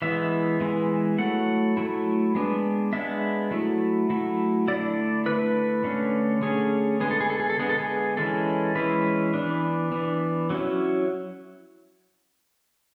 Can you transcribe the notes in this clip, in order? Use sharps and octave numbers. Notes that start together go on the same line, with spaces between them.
E3 G#3 B3 E4 E5
E3 G#3 B3 E4
F#3 A3 E4 F#5
F#3 A3 E4
G#3 B3 D4
G#3 B3 D4 E5
F#3 A3 E4
F#3 A3 E4
D3 A3 E4 D5
D3 A3 E4 B4
D3 A3 C#4
D3 A3 C#4 G#4
D3 G#3 B3 G#4
A4
G#4
A4
G#4
A4
D3 G#3 B3 G#4
A4
G#4
E3 G#3 C#4 E4 A4
E3 G#3 C#4 E4 B4
E3 B3 D4
E3 B3 D4
F#3 C#4 E4